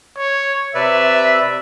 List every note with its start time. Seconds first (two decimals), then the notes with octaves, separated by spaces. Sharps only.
0.18 C#5
0.75 C3 B4 D5 E5